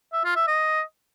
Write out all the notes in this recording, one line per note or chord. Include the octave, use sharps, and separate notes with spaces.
E5
F4
E5
D#5